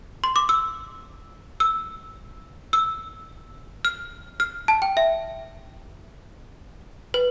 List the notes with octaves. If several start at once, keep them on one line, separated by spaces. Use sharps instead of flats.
C6
D6
E6
E6
E6
F6
F6
A5
G5
E5
B4